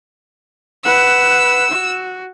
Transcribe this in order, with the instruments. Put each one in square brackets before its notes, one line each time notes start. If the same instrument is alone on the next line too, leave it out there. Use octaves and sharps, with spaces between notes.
[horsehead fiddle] B4 F#5 [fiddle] E6
[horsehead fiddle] F#4